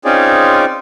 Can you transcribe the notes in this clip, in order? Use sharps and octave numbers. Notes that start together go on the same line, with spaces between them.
C4 C#4 D#4 F4 G#4 D5